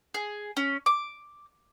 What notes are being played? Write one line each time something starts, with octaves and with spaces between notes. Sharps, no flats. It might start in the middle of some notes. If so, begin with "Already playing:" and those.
G#4
C#4
D6